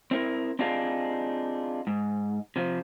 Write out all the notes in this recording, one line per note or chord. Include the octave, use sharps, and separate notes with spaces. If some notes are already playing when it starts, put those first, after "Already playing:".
C4 E4 A#4
C4 D4 D#4 F4 G4 G#4
G#2
C3 F3